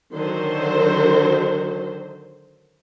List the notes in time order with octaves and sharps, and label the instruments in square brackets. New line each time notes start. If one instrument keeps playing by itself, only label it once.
[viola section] D3 D#3 F#3 C5